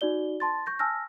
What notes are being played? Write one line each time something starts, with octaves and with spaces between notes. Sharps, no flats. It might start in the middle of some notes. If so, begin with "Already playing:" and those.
D#4 F#4 D5 G7
A5 C6 A6
C#6 G6 A#6
G#5 A5 E6 F6 A#6